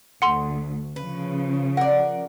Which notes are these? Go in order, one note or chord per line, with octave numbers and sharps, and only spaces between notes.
D2 F#5 C6
C#3 F3 B4
A#4 D5 F#5